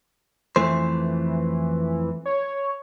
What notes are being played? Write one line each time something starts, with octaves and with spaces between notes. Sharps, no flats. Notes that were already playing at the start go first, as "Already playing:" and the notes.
F2 E3 A3 C5
C#5